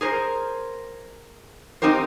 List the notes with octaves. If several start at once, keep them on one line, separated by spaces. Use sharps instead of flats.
G#4 A#4 C5
C4 D#4 G4 A#4 C5